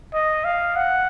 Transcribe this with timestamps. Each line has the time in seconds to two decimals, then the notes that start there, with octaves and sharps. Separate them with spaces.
0.13 D#5
0.44 F5
0.76 F#5